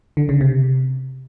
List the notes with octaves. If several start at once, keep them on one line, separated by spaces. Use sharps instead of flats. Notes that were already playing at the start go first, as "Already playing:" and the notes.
D3
C#3
C3